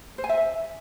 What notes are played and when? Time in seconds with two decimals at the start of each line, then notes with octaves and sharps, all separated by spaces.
0.18 C5
0.24 G#5
0.29 E5